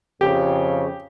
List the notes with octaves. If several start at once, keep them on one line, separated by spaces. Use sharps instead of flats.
F2 C#3 G4